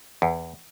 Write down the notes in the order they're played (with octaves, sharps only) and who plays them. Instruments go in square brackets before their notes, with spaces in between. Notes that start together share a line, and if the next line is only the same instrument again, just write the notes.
[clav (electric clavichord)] E2